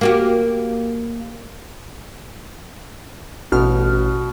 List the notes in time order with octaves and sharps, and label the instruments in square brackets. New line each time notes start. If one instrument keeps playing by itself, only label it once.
[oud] A#3 F#4 G4
[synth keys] A1 F6 [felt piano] B2